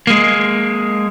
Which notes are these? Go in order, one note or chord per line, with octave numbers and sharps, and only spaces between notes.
G#3 A#3